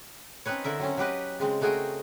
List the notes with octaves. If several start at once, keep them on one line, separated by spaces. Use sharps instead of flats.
C4 C#4 D#4 B4 C#5
D3 E4 A#4 E5
F#3 C4 C#4
F#3 G4 B4 D#5
C#3 G#3 C4
A3 F#4 G#4 A#4 D#5 G5